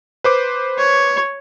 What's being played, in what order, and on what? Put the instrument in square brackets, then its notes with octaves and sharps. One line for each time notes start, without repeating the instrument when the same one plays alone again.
[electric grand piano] B4 C5 D6
[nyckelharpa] C#5